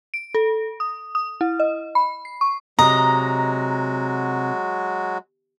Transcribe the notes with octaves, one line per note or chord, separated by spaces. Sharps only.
D7
A4
D#6
D#6
E4
D#5
B5
C7
C#6
C3 F#3 G#3 F#4 D#5 A#5